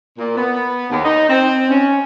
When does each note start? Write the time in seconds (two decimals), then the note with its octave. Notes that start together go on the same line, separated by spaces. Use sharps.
0.18 A#2
0.36 B3
0.90 D#2
1.05 D#4
1.29 C4
1.70 C#4